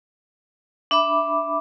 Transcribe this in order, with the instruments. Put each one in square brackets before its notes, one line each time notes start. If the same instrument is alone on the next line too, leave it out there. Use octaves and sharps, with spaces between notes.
[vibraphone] D4 E5 B5 D6